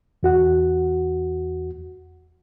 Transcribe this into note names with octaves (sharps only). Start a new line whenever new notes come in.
E2 F#4 F#5